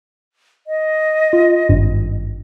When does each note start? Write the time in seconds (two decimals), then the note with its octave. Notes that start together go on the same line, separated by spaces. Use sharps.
0.67 D#5
1.33 F4
1.69 G#1 G2